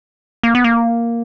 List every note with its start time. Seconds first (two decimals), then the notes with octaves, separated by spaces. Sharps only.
0.43 A#3
0.55 B3
0.64 A#3